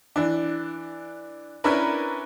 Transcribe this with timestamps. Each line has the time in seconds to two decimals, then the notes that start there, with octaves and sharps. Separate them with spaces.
0.16 E3 D4
1.64 C#4 D4 E4 A#4 B4